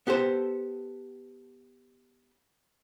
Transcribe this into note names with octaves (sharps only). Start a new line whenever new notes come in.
B3 G4 A4 C5